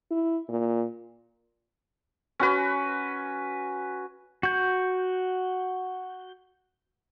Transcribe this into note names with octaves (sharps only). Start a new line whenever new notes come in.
E4
A#2
C#4 F#4 B4
F#4 G6